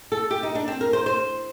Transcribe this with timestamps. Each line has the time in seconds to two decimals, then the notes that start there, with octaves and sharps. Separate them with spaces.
0.12 A4
0.31 G4
0.43 D#4
0.55 D4
0.68 C4
0.81 A#4
0.93 C5
1.06 C5